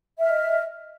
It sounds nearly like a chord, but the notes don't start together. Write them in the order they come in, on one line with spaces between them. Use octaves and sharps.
E5 F6 D#5